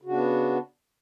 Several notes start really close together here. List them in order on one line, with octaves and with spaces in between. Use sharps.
C#3 F#4 D4 B3